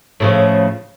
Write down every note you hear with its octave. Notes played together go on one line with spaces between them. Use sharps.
A2 C#3 F3